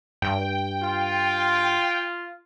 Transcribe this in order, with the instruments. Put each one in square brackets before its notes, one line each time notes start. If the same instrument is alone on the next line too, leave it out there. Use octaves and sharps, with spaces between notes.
[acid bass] G2 [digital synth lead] G5
[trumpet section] F4